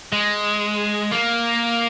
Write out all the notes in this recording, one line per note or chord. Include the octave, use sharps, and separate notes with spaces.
G#3
A#3